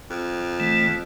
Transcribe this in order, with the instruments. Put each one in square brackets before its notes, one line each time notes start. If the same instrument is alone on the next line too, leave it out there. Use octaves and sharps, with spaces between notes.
[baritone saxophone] F2
[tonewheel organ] E3 A3